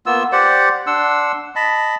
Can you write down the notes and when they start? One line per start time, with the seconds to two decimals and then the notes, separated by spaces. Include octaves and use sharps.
0.06 A#3 B3 F4 E6
0.32 G4 C5 D5 F#5
0.87 D4 F#5 C6 E6
1.56 D#5 A5 B5